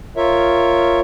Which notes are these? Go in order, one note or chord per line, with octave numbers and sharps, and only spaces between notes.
F4 A#4 C#5 E5